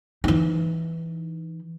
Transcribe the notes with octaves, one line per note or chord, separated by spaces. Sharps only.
E3 D#4